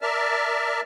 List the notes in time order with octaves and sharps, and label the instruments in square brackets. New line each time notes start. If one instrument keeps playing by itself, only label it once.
[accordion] A#4 D5 E5 A5 F6